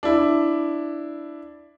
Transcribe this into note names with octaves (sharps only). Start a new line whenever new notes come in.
D4 E4